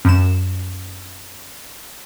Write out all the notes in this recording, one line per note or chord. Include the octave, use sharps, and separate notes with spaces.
F#2 E7